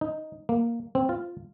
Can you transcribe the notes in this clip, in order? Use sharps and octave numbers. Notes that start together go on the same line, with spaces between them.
D#4
A#3
C4
F4